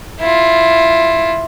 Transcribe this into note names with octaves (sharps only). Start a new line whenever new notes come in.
E4 F4